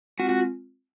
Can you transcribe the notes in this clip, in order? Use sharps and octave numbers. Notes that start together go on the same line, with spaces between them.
G#3 C4 F4 F#4
F#4